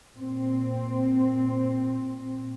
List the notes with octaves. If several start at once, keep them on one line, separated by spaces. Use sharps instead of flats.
A#2 C4